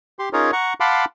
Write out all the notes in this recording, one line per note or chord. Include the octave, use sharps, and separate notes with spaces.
G4 C6
C#4 D#4 F4 G#4 A#4 C#5
F#5 A#5 C#6
F5 F#5 A5 B5 C6 D6